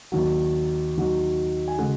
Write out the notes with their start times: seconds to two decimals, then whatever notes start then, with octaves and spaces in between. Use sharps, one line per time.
0.12 D#2 D#3 F#3
0.96 D#2 D#3 F#3
1.68 G#5
1.78 C#3 G#3 F#4 F#5